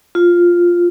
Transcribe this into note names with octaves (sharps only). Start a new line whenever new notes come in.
F4